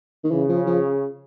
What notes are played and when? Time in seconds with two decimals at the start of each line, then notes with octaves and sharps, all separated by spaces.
0.24 D#3
0.31 C#3 E3
0.49 F3
0.67 F3